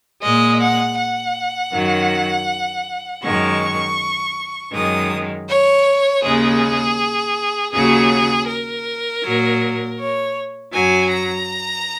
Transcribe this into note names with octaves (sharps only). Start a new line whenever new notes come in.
A#2 G#3 D#5
F#5
F#5
F#2 D#3 F#3
F#2 D#3 G#3 C#6
F#2 D#3 G#3 D#6
C#5
D#2 C#3 G#3 G#4
D#2 C#3 F#3 G#4
A#4
A#2 F#3
C#5
F#2 F#3 G#5
A#5